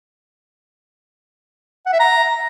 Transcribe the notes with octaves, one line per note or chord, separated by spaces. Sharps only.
F#5
E5
A#5